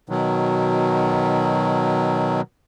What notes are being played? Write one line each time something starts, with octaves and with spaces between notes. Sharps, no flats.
B2 D#3 F#3